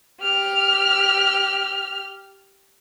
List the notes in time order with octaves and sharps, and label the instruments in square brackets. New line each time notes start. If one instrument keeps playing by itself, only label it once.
[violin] G4 F6